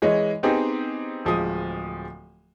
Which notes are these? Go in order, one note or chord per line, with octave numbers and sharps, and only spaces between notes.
E3 G#3 C#5 D#5
B3 C4 D#4 G4 G#4
D1 F3 G#3 D#6